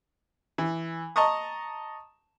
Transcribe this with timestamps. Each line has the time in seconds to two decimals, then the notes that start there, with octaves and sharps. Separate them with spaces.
0.58 E3
1.16 D#5 A5 A#5 C#6 D#6